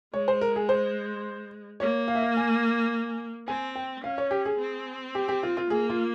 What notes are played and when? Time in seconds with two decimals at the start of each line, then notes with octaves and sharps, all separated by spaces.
0.14 G#3 C#5
0.28 C5
0.41 A#4
0.56 G#4
0.69 C5
1.80 A#3 C#5
2.08 F5
2.15 E5
2.22 F5
2.37 G#5
3.48 C4 G#5
3.76 G5
4.04 C#4 F5
4.18 C#5
4.31 G4
4.45 G#4
4.59 C4
5.15 G4
5.28 G4
5.43 F4
5.57 F4
5.70 A#3 G#4
5.90 F4